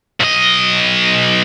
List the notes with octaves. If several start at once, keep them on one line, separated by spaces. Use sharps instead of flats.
B1 D#5